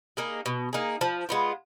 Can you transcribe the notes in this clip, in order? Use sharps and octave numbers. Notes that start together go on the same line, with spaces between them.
A#3 D#4 G#4
B2
A#3 D#4 G#4
F3
G#3 B3 F4